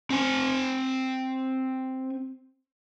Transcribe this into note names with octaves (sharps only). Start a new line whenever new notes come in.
C4 G#5